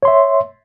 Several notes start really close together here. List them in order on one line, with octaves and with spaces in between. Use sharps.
C#5 C6 E5